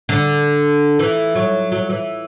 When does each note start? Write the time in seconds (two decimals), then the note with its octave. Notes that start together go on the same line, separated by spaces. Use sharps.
0.09 D3
0.99 E3
1.36 F#3
1.72 F#3
1.90 E3